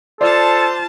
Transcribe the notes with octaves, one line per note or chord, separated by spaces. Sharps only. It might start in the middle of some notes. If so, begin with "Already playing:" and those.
F4 A4 C5 D5 A5